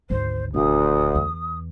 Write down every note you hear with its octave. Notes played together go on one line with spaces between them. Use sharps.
G#1 D2 C5
D#1 D2 D#6
E2